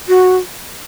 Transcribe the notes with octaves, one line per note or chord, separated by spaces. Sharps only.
F#4